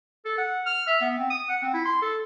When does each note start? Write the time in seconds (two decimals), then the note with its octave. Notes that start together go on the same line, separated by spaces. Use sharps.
0.25 A4
0.38 F#5
0.66 F6
0.87 E5
1.01 B3
1.18 C4
1.30 D#6
1.48 F#5
1.62 C4
1.74 E4
1.85 C6
2.02 A4